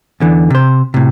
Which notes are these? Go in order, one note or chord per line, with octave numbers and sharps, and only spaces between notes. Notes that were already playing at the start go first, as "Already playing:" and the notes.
E2 D3 E3
C3 C5
A2 C3